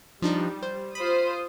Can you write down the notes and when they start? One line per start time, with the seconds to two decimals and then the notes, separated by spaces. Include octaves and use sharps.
0.22 F3 G3 D4 D#4
0.62 C5
0.95 F4 C5 B5 D#6